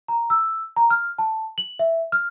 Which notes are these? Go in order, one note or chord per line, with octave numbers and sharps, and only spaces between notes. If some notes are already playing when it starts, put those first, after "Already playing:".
A#5
E6
A#5
F6
A5
F#7
E5
F6